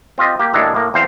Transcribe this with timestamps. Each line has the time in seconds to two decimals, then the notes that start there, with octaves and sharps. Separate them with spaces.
0.18 C4 F4 G4 D#5
0.40 A#3 G4
0.54 D#2 A2 G#3 D4 A4 A#5
0.75 A2 A#3 A#4
0.94 E2 C4 C5 F5